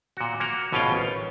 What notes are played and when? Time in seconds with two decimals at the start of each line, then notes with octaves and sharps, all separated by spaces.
0.17 A#2 F#4
0.40 A#3 F#4 A#4
0.72 G#1 B2 C#4 F4 F5 G5
0.92 A1